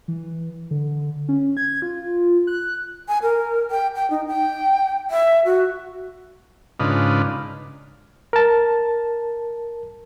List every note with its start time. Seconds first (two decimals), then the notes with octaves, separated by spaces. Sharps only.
0.08 E3
0.71 D3
1.29 C#4
1.57 G#6
1.82 F4
2.47 F#6
3.08 G#5
3.23 A#4
3.71 G5
3.95 G5
4.10 D#4
4.27 G5
5.10 E5
5.45 F#4
6.80 G#2 C#3 D4 D#4 F4 B4
8.33 A#4 A5